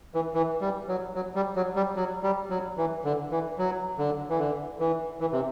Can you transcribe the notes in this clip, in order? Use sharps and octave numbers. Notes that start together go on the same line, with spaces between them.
E3
E3
G3
F#3
F#3
G3
F#3
G3
F#3
G3
F#3
E3
D3
E3
F#3
D3
E3
D3
E3
E3
C3